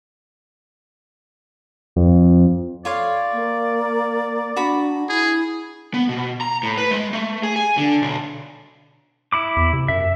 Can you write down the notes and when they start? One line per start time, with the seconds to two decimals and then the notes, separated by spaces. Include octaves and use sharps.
1.96 F2
2.85 F4 A4 C#5 D5 F5
3.33 A#3
4.56 D4 F#4 A#5 B5
5.09 E4 G#4
5.94 B3
6.09 B2
6.41 A#5
6.63 A2
6.78 B4
6.91 G#3
7.13 A3
7.43 G#4
7.56 G#5
7.78 D3
8.02 B1
9.33 E4 B5 D6
9.57 E2
9.73 C3
9.88 F#2 E5